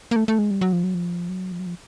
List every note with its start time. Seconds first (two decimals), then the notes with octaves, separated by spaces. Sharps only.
0.11 A#3
0.16 A3
0.28 A3
0.39 G#3
0.51 G3
0.61 F#3
0.73 F3
0.84 F#3
0.94 F3
1.29 F#3
1.52 F3
1.59 F#3
1.66 F3